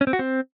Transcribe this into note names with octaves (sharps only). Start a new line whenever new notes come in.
C#4
C4
F#4
C4